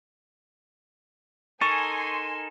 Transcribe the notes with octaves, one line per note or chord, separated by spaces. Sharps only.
D#4 A4 A#4 G#5 C6 C#6 A6